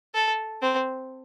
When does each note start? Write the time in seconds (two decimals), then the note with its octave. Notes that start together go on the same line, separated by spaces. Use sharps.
0.15 A4
0.62 C4